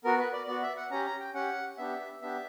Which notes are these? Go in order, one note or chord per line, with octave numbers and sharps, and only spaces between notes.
B3 F#4 A#4
B4
D5
B3 F#4 D5
E5
F#5
C#4 G4 A#5
A#5
G5
C#4 G4 F#5
B3 D4 G4 E5
B3 D4 G4 E5